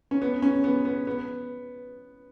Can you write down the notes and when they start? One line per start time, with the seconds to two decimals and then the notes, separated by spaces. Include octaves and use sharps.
0.11 C#4
0.22 B3
0.42 C#4
0.64 B3
0.85 B3
1.07 B3